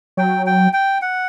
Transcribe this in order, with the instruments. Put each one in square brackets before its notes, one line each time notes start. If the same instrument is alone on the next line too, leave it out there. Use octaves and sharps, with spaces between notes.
[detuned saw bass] F#3 [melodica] G5
[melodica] G5
G5
F#5